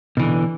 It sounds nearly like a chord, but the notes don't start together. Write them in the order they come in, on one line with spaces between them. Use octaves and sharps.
B2 E3 D3